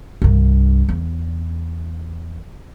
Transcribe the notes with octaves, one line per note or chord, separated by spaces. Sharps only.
C2 G2
E2